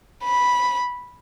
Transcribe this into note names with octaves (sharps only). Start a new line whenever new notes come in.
B5